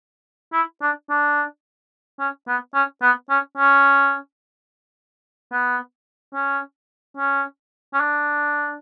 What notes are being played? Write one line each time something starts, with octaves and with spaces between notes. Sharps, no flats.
E4
D4
D4
C#4
B3
C#4
B3
C#4
C#4
B3
C#4
C#4
C#4
D4